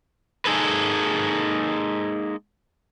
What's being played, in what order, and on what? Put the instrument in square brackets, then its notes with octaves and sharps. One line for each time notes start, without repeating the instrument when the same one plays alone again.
[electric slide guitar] G#3 A#3 D#4 G#4 A4 B4